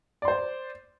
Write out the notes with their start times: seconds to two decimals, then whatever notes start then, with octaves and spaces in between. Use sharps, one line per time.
0.22 D5
0.25 C6
0.28 C5